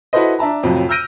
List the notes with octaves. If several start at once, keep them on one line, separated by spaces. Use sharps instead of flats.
E4 F#4 A4 B4 C5 D#5
D4 E5 A5 A#5
F2 A2 C3 F3 F#3
E6 F6 G6 A#6 D7 D#7